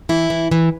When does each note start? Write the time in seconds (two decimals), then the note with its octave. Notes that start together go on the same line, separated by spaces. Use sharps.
0.09 E3 E4
0.30 E3
0.51 E3